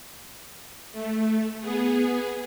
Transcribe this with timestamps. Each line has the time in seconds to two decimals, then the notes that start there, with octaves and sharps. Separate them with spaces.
0.92 A3
1.60 B3 G#4